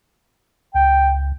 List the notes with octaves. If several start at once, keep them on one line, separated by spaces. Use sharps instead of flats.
C#2 G5